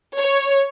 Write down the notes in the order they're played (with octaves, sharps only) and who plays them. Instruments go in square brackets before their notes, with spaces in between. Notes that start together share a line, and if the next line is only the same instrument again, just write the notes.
[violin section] C#5